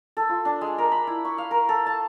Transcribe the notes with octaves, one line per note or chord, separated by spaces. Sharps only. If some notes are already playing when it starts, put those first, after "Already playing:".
A4
F4
D4
G#3
A#4
B5
E4
C#6
F5
A#4
A4
A5